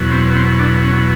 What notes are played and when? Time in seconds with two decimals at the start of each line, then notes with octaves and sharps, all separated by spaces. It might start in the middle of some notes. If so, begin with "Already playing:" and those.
Already playing: E2 B2 F#3
0.11 C4
0.36 C4
0.59 D4
0.84 C#4